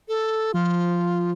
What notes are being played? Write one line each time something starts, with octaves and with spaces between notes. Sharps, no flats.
A4
F3 F4